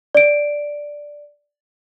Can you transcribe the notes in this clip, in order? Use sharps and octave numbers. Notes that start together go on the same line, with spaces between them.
D5 D7